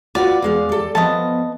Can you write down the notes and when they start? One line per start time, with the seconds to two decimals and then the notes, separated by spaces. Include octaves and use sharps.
0.15 F4 F#4 B4 D5
0.42 E2 G#3 F5
0.69 G3 A4
0.95 F3 B3 D#5 A5